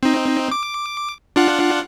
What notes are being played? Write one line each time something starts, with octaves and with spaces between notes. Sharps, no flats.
C4 D#4
D6
D4 F4 F#5